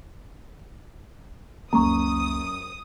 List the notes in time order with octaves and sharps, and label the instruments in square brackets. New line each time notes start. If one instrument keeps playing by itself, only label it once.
[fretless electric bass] C#2 A#3 [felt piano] F#2 [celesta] A#5 C#6 [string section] D#6